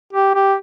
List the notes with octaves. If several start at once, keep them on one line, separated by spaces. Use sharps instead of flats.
G4
G4